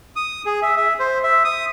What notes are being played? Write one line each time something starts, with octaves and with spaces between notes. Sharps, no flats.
D#6
G#4
E5
E5
C5
E5
D#6